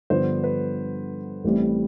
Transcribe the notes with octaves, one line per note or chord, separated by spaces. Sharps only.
G2 D3 F3 B3 C5
B4
A1 A2 G3 C4